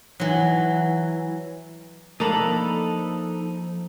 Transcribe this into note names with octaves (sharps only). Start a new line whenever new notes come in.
E3 F#3
F3 A#3 D4 D#4 A4 A#5 B5